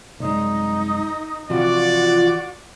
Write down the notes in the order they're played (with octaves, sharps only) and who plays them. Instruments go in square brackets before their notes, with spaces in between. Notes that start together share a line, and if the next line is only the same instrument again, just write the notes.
[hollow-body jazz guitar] C2 F#2 G#3 [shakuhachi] D#4
[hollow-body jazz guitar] C3 E3 F3 [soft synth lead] F4 [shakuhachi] F#4 [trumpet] D5